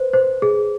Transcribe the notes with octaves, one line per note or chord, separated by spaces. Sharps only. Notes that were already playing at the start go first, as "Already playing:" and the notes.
Already playing: B4 C5
C5
G#4